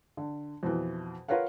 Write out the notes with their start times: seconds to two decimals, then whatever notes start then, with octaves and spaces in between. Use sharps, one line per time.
0.17 D3
0.63 F2 B2 E3
1.28 F4 A#4 B4 C#5 F5 F#5